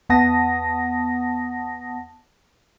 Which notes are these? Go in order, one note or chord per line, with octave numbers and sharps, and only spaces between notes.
E2 B3 F#5 A5 D#6 A#6